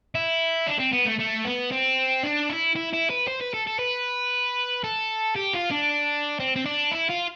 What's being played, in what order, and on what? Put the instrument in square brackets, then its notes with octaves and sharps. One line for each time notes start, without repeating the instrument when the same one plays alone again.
[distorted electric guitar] E4
D4
C4
B3
A3
A3
B3
C4
D4
E4
E4
E4
B4
C5
B4
A4
A4
B4
A4
G4
F4
D4
C4
C4
D4
E4
F4